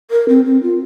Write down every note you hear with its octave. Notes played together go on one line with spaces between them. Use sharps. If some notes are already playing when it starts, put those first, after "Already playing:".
A#4
C4
C4
F4